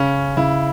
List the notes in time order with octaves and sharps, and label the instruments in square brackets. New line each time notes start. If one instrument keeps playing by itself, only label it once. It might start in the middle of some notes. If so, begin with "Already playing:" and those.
Already playing: [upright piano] C#3 [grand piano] C#4
[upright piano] C#3 [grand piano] E4